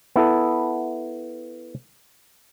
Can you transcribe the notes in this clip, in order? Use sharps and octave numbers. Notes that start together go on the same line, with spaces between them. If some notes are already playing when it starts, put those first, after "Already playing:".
B3 E4 A4